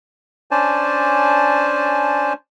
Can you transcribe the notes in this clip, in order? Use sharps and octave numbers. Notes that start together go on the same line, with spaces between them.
C#4 D4 C5 D5 G#5 A5